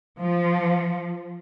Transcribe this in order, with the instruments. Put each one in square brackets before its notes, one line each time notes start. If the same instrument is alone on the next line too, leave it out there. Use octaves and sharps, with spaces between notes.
[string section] F3